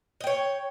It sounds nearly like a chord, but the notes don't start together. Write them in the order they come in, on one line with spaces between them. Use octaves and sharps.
D#5 G5 C#5